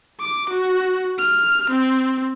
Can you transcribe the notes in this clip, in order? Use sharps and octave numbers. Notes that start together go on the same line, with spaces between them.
D6
F#4
F6
C4